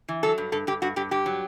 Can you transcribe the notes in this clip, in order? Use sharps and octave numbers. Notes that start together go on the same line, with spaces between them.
E3
F#3 A4
G2
G2 A4
G2 G4
G2 F#4
G2 G4
G2 G4
F#3